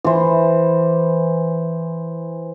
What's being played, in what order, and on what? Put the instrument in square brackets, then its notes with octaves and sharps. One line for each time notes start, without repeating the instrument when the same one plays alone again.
[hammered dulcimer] E3 C5